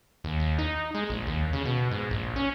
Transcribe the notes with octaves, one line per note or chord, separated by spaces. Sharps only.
D#2
D#2
D#4
G#3
A#1
D#2
C#3
B2
G#2
A#1
C#4